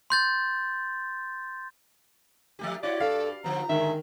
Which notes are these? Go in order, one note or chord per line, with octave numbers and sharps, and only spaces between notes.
C6 G6 A6
F3 A3 G4
E4 F#4 C#5 D5
G2 A4 F5
D3 F3 B3 A#5
G#2 D3 D#3 G#3 E5